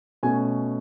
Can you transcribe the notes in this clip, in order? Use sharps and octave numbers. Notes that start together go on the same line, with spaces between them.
B2 A3 C#4 G#5